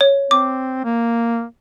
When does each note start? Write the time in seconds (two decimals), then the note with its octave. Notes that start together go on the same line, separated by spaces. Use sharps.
0.01 C#5
0.31 C4 D6
0.85 A#3